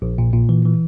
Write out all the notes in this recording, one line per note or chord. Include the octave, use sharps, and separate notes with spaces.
A#1
A#2
A#2
E3
E3